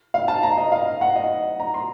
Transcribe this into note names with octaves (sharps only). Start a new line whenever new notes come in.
F5
A5
A#5
D#5
F5
F#5
D#5
A#5
C6